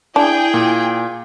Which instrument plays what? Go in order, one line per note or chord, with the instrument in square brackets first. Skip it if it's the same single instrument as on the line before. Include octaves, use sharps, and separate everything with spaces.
[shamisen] D4 [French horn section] E4 [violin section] G#4 G5
[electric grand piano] A#2